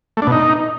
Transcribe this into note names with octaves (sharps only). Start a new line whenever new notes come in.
A3
D4
B2
D#4